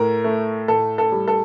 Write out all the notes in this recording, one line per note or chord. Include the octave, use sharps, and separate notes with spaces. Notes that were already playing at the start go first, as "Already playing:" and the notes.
Already playing: A2 A#4
A3
A2 A4
A4
G3
A4